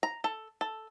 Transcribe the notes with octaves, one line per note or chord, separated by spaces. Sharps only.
A#5
A4
A4